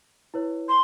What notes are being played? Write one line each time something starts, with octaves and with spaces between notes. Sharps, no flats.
E4 B4 C#5
C6